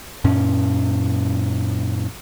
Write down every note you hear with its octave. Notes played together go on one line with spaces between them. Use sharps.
F#2 A#2 C#4